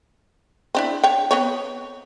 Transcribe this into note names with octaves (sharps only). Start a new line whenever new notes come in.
C4 D4 E4
C#5 G5
B3 C4 C#5